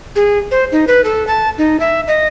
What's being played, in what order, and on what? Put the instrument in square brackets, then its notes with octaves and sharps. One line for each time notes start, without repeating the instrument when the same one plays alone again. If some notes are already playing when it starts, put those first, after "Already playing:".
[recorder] G#4
C5
D#4
B4
A4
A5
D#4
E5
D#5